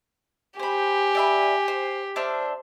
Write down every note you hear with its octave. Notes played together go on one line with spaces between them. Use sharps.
G4 C5 G#5 B5
D5 E5 B5
C5
D4 C5 E5 F6